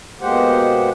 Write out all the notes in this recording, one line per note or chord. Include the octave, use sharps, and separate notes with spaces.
B2 G#3 A#3 G4 C5 F#5